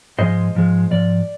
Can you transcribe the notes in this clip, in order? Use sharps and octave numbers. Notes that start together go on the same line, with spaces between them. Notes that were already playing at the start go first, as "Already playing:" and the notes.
G#2 F3 G#3 C5 D#5
G#2 F3 G#3
G#2 F3 D5